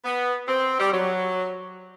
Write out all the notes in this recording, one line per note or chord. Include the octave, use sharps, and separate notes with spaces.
B3
C4
G3
F#3